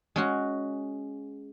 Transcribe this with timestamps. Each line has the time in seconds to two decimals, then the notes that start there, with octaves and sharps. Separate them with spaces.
0.16 G#3 C#4 F#4